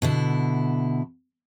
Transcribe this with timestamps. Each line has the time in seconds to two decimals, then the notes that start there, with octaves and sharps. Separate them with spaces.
0.02 B2 D3 E4